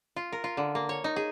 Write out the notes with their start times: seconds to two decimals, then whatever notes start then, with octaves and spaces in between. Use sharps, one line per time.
0.16 F4
0.32 A#4
0.44 F4
0.57 D3
0.75 A#3
0.89 C#5
1.04 D#4
1.16 G#4